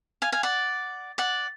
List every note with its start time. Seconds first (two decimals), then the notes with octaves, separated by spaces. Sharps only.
0.22 F5 G#5
0.32 F5 G#5
0.43 D5 F#5
1.18 D5 F#5